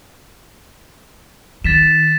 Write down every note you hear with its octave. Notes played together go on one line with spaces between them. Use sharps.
D#3 A6 B6 E7